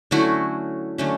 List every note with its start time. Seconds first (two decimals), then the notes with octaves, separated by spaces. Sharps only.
0.11 D3 F#3 A3 C#4 E4 F#4
0.98 D3 F#3 A3 C#4